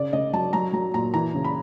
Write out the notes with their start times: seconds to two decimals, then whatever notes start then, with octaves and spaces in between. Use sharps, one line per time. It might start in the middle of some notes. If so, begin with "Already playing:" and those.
Already playing: C#3 D5
0.13 C#3 D#5
0.33 F#3 A5
0.53 F#3 A#5
0.73 F#3 A#5
0.94 A#2 A#5
1.14 E3 A#5
1.35 C#3
1.44 B5